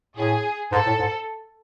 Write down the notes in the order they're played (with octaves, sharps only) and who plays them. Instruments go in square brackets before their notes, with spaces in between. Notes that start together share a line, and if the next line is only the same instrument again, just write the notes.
[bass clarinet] A2 [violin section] G#4
[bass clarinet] G#2 [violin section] A4
[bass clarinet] A2
G#2